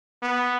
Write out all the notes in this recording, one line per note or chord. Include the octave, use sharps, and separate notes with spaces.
B3